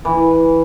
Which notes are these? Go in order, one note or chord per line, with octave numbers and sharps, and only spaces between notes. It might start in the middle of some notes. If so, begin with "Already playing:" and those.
E3